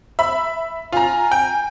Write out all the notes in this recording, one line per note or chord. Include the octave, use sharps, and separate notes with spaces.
E5 B5
F4 G#5 A#5
G5